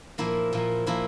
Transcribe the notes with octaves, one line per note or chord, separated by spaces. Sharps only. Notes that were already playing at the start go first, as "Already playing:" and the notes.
A#2 F3 A#3 E4
A#2 F3 A#3
A#2 F3 A#3 E4